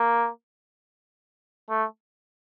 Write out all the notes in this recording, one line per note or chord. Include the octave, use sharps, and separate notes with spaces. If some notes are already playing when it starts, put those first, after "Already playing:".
Already playing: A#3
A3